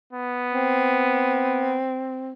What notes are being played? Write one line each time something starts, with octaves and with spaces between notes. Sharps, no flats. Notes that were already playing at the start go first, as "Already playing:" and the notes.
B3
C4